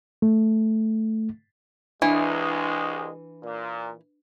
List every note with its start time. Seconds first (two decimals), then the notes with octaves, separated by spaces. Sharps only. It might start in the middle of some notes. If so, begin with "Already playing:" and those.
0.22 A3
2.02 C2 E3 G#3 D4
3.43 A#2